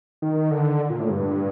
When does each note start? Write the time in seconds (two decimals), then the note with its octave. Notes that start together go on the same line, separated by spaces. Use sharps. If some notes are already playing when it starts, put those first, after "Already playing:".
0.22 D#3
0.51 D3
0.90 A#2
1.00 A2
1.10 G2